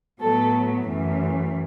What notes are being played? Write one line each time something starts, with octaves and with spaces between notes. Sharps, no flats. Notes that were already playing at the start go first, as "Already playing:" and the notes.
A2 F#3 B3 A4
F#2 E3 A3